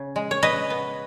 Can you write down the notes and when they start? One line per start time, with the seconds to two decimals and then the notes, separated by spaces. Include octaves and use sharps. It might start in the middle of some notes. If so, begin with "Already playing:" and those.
Already playing: C#3
0.16 G#3
0.31 C#5
0.43 C#3 B4 D#5
0.70 B3